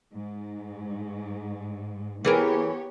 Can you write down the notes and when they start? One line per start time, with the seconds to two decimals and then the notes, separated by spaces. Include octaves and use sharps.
0.15 G#2
2.25 E3 B3 G4 G#4 A#4 C#5